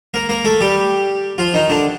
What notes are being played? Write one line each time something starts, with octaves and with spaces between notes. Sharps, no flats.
A#3 A#4
A#3 A#4
A3 A4
G3 G4
F3 F4
D#3 D#4
D3 D4